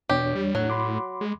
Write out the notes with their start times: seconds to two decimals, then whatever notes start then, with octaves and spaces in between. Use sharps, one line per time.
0.10 E2 B2 D4 G4 C#5
0.35 G3
0.55 A2 F#3
0.70 B5 C6 D6
1.21 G#3